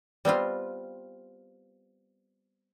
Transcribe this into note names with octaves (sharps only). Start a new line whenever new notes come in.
G3 B3 C4 F4